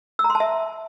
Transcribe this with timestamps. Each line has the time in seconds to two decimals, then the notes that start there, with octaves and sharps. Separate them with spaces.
0.19 E6
0.24 A#5
0.30 C6
0.35 A5
0.40 E5